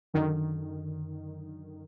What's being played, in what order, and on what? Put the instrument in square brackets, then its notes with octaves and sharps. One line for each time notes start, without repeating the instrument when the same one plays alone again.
[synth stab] F#2 D3 D#3